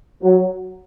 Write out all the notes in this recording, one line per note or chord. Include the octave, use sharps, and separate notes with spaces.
F#3